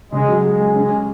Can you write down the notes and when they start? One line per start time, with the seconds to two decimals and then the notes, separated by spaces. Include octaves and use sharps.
0.12 C#3 G#3
0.28 F#3
0.44 G#3 G#4
0.60 G#4
0.76 G#3 C#4
0.92 G#4